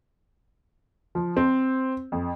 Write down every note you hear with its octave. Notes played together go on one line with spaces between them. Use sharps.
F3
C4
F2